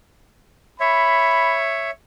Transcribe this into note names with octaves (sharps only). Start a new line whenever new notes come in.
C#5 E5 B5